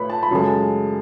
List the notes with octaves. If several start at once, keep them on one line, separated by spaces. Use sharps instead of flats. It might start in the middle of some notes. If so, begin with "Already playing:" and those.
Already playing: A2 A3 B4 C#5 B5
A5
B5
F#2 C#3 G#3 A4 A5